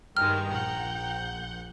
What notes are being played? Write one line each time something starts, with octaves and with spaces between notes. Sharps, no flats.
G2 D#3 G#3 G5 A#5 F6
A#1 F#5 G6